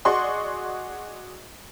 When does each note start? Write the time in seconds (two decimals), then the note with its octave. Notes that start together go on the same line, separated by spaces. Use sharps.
0.05 F#4 G#4 D5 D#5 C6 C#6